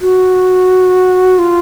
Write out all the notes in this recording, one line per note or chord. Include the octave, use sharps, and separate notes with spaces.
F#4
F4